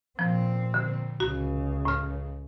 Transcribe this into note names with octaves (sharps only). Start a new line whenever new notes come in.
A#2 F3 C4
D3
C#2 C#3 F#4
A2 F6